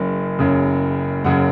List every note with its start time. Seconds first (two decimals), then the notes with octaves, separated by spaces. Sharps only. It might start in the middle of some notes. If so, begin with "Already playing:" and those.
Already playing: F#1 F#2 C#3
0.39 F#1 F#2 C#3
1.24 F#1 F#2 C#3 F#5